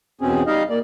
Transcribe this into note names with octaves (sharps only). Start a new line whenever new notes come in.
E2 B2 C4 C#4 G#4
G3 D#4 D#5 F5
A#3 D5